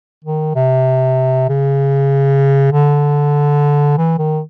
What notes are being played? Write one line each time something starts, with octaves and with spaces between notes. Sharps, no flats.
D#3
C3
C#3
D3
E3
D#3